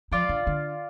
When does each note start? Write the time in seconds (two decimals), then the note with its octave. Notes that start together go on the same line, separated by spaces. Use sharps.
0.11 F3 F4 D5 F5
0.29 D3
0.47 D3